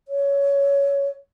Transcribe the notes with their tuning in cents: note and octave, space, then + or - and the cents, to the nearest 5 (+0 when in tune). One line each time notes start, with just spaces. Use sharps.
C#5 +15